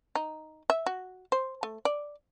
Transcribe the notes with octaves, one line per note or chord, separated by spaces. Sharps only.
D#4
E5
F#4
C5
A3
D5